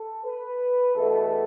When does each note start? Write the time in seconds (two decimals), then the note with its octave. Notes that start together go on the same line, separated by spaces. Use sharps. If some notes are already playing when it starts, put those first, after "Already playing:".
Already playing: A4
0.24 B4
0.95 E2 B2 A3 A4